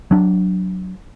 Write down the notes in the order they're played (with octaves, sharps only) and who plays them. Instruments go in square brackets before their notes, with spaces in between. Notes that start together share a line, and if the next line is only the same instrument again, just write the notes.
[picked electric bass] F#3 D4